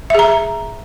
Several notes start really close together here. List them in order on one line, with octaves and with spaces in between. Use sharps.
E5 G#4 A#5